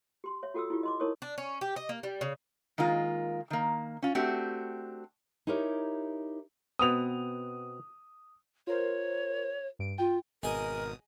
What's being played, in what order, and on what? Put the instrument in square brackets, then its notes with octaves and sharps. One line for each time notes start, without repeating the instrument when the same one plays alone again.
[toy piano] G4 C6
C#5 E5
F4 F#4 A4 G5 D#6 E6
E4 F4 G4
D#5 C6 D6
D#4 E4 A#4 C#5 C#6 D#6
[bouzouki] D4
C#4
G4
D#5
A#3
G3
C#3
[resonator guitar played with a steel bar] D#3 G#3 A#3 F4
D#3 A#3
C#4 F4
A3 C4 D4 F#4 G4
[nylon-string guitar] D#4 E4 G4 A#4 C#5
[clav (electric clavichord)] B2 B3 C4 [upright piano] D#6 F7
[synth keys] F4 A#4 C5 [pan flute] C#5
[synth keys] G2 D7
[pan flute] F4 [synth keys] G5
[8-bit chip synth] G#1 B2 D#6 [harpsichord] G#4 D#5 G#5 [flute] A#4